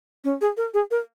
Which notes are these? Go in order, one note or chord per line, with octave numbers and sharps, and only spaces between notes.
C#4
G#4
A#4
G#4
A#4